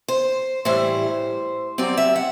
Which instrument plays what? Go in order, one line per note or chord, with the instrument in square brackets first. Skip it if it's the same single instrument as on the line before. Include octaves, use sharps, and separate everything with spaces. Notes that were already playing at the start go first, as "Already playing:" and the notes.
[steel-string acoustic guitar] C5
A2 E3 G3 C5
G2 F#3 C4 D5
E5
F#5